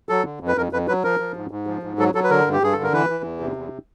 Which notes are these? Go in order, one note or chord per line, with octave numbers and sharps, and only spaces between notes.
F#3 A4
D3
F2
B4
F2 A#4
F2 B4
F#3 B4
F3 A#4
F3
G#2
G#2
F3
G#2
F#3 A4
F#3 A4
B4
D3 A#4
G2
G4
G2 G#4
D3 A4
A#4
E3 B4
E3
E2
C3
E2